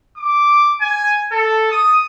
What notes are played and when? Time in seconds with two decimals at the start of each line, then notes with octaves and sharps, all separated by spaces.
0.17 D6
0.81 G#5
1.31 A4
1.71 D#6